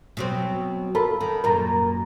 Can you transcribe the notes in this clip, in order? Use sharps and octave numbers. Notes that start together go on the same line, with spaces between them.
B2 F#3 C4
F4 A4 A#4 B5
D#3
F#2 A#2 A#4 A#5